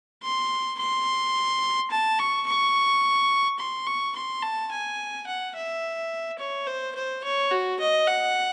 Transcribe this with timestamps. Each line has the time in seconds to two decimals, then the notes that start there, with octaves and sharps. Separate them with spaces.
0.23 C6
0.79 C6
1.91 A5
2.19 C#6
2.47 C#6
3.59 C6
3.86 C#6
4.15 C6
4.43 A5
4.72 G#5
5.26 F#5
5.55 E5
6.39 C#5
6.67 C5
6.95 C5
7.24 C#5
7.51 F#4
7.79 D#5
8.07 F#5